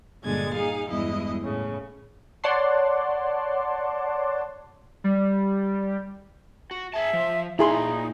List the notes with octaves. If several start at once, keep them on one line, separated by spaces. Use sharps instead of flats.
G2 A#2 D3 G#3 G#6 A6
D#4 G#4 F5
E2 G2 G#3 E4 D#5
A2 C#3
C#5 D5 F#5 A5 C6
G3
F#4
G#4 E5 A5
F3
A#2 D#4 E4 G#4 B5 C6